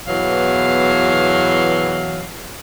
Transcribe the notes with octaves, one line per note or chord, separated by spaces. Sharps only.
E2 B2 E3 F#3 F5